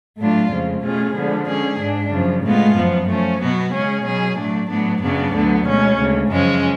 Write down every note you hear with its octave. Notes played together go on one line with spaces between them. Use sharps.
A2 F#3 A3 D4 F4
F2 C#3 F3 G#3
B2 A3 C#4 F4 G#4
D3 F3 G#3 B3
D3 G#3 C#4 G#4
G#2 G#3 D4
F#2 C#3 F3
A2 G#3 B3 F4
F#2 F3 B3
F3 A3 C#4
B2 F#3 B3 F#4
C#3 G#3 C#4 G#4
B2 F#3 C#4 G#4
A2 F#3 A3 D4
A2 F#3 B3 D4
F#2 C#3 F#3 B3 D4
D2 D3 F#3 B3
B2 G#3 C#4
D2 C#3 G#3
F#2 C#3 F3 G#3 C#4